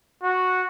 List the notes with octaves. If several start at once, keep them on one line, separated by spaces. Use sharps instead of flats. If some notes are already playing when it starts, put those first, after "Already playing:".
F#4